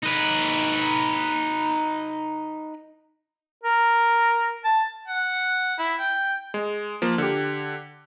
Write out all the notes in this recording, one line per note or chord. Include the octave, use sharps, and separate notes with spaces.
D#4 B4
A#4
A5
F#5
E4
G5
G#3
F3 A#3
D3 G4